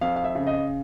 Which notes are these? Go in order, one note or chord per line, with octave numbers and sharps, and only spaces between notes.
F2 F5
F5
E5
C#3
D#5